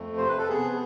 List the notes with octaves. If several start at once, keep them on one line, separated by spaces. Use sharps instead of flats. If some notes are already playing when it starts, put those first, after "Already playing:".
Already playing: F2 A3
C3 C5
B4
A4
B3 G#4